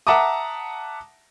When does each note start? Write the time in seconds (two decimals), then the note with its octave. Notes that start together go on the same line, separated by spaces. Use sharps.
0.07 E5 F#5 A5 A#5 D6 D#6